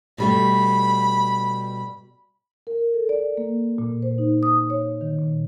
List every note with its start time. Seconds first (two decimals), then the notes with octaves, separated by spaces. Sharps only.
0.18 B2 G3 A3 B5
2.67 A#4
2.94 A4
3.09 D5
3.37 A#3
3.78 A#2
4.02 C5
4.18 D#4
4.43 D#6
4.70 C#5
5.01 D#3
5.19 A#2